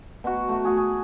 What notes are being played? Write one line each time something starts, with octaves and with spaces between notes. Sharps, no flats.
B2 F#4
A3 F#4
F#4 G#4
G#4